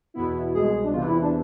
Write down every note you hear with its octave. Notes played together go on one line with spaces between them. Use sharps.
E2 B2 B3 E4
C2 B2 G#3 G#4
G#4
D4
E2 C3 E3 F4
E4
D4